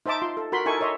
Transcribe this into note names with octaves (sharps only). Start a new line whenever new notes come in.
D#4 C5 E5 A5 D6
F4 C6
A4
F#4 A#4 B5 C6
D#4 E4 A4 A#4 G#5 C#6
C#5 D#5 E5 C6